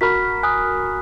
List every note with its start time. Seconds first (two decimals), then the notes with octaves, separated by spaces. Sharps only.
0.01 F#4 A#4 B5 F6 B6
0.43 G#5 D#6 F#6